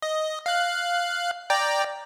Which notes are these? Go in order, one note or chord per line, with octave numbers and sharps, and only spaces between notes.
D#5
F5 F#6
D5 G5 A#5